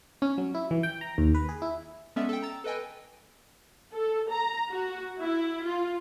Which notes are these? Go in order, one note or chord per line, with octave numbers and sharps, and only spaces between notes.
C#4
F#3
E4
E3
G5
A#5
D#2
B4
G#4
E4
G#3 B3 C#4 A4 D5 E5
A4 G5
A#5 E6 A6
A4 B4 D#5 G5 G#5
A4
A#5
F#4
E4
F4